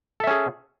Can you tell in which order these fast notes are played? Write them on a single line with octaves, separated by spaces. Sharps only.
A4 E5 C#4 G#4